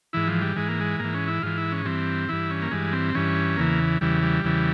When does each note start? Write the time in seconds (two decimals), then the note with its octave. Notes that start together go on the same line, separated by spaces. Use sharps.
0.13 G#2 E3 E4
0.27 F3
0.42 G3
0.56 G#2 E3 G#3
0.68 A#3
0.81 G#3
1.00 G#2 E3 A#3
1.14 C#4
1.28 E4
1.42 G#2 E3 F4
1.58 E4
1.72 C#4
1.85 G2 E3 C4
2.29 G2 E3 E4
2.51 C#4
2.62 A#3
2.71 G2 E3 G#3
2.93 C4
3.14 G2 E3 C#4
3.57 E2 C#3 E3 A#3
4.01 E2 C#3 E3 G3
4.23 G3
4.44 E2 C#3 E3